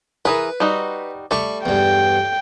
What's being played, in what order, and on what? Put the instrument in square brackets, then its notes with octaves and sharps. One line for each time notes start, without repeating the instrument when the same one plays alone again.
[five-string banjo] E3 G#4 A#4 [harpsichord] B4
[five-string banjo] G3 D#4 F#4
[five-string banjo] G3 A3 [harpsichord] D5 C#6
[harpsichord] E2 G2 [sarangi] G5